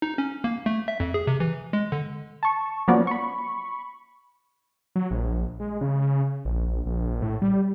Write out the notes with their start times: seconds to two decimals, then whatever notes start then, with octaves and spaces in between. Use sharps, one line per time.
0.02 D#4
0.18 C#4
0.44 A#3
0.66 A3
0.88 E5
1.00 F2
1.14 G#4
1.27 C3
1.40 E3
1.73 G#3
1.92 D3
2.43 A5 C#6
2.88 F3 F#3 A#3 B3 C#4 D5
3.07 B5 C#6
4.96 F#3
5.11 A#1
5.60 G#3
5.81 C#3
6.45 A#1
6.86 A#1
7.22 A2
7.42 G3